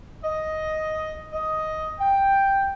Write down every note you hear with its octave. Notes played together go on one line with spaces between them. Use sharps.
D#5
D#5
G5